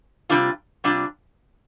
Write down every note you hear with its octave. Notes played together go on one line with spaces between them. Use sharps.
C3 G3 D4 F4
C3 G3 D4 F4